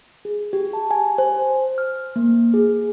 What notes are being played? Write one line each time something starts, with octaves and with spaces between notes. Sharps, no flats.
G#4
G4
A5
G#5
C5
F6
A#3
G#4